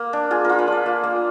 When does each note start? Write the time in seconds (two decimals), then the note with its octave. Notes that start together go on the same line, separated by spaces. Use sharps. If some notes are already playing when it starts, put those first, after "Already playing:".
Already playing: A#3
0.13 D4
0.31 F4 G#4
0.45 F4 A#4
0.59 B4
0.68 D4 D5
0.86 A#3
1.04 A#3